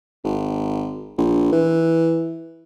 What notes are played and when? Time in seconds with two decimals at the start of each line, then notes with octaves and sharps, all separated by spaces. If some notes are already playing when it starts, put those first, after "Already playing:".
0.24 G#1
1.18 A#1
1.52 E3